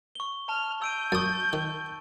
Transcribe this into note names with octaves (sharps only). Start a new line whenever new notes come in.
C#6 G7
A5 F6
E6 G6 D7 D#7
F#2 C#6 D#6 A6
D#3